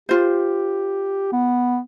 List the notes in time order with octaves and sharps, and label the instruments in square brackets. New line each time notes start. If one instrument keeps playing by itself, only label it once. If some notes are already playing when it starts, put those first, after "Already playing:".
[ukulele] F4 C5 [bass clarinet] G4
[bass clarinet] B3